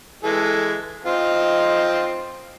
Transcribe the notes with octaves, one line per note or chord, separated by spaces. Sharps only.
E3 G#3 A4
C4 D#4 F4